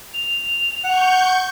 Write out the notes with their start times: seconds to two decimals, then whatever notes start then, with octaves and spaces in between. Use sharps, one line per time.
0.14 F7
0.84 F#5 C#6 G6